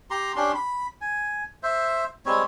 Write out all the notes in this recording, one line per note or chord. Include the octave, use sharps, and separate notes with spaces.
G4 A#5 C6
C#4 D4 G4 C6
B5
G#5
C5 E5
G3 G#3 C4 C#5